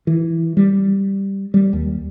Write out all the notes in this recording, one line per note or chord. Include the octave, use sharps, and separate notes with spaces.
E3
G3
G3
D#2